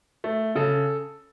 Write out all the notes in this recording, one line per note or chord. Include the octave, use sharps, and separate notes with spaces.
A3
C#3 A4